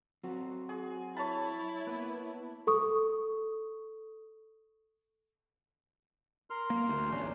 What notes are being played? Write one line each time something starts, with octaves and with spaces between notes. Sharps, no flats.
F#3 C4 F#4
G#4
E4 C#5 A5 B5 A6
A#3 B3 B4
A4 C#6 D#6
A#4 C6 F6
A#3
D2
D1 A1 C#4 D4